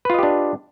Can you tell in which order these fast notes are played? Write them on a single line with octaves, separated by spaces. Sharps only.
B4 F4 D#5 G4 D4